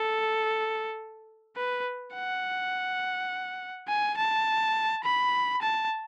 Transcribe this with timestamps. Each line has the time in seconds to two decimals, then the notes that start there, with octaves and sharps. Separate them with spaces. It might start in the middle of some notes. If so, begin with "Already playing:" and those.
Already playing: A4
1.57 B4
2.15 F#5
3.88 G#5
4.17 A5
5.04 B5
5.62 A5